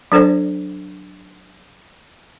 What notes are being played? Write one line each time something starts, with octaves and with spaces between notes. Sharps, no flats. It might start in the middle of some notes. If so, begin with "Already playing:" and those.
F#3 D4 A4 C5 D5